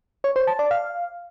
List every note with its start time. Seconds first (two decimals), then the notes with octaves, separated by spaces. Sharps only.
0.24 C#5
0.36 C5
0.47 A5
0.59 D5
0.71 F5